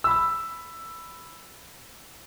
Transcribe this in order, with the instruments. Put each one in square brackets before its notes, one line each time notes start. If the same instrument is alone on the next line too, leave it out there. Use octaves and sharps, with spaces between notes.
[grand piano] B5 E6